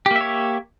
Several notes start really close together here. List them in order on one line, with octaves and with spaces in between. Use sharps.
G4 A#3 E5 C#5